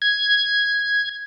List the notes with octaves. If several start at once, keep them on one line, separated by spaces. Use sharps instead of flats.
G#6